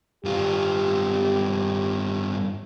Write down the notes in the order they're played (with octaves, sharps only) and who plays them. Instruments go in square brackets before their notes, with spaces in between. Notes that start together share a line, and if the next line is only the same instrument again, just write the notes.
[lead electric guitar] G2 F4 [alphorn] G4